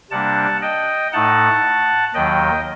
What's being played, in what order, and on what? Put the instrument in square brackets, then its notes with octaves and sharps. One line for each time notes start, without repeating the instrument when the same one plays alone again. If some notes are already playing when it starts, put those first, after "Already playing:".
[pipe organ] C3 G3 A#3 D4 F#5 A5
D#5 G5
A2 A3 D#4 F#5 A5
D#2 D#3 F#3 D#5 G5